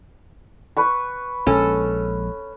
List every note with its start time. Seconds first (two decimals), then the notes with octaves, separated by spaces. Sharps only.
0.77 B4 B5 C#6
1.47 A#1 G#3 C#4 A4